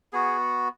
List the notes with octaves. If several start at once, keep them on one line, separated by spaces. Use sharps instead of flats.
B3 F#4 G#4